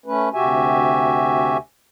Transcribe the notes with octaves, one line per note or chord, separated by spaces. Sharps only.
A3 C#4 B4
D2 C3 F#4 G4 E5 G#5